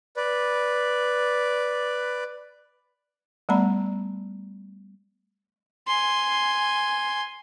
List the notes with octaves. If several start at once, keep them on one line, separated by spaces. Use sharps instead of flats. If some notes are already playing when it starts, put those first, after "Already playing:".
B4 D5
G3 A3 B3 D5 A#5 B5
G#5 C6